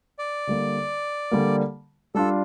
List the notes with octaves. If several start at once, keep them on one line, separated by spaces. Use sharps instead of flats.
D5
D3 G3 A#3
D3 G3 A#3
G3 D4 F4 A4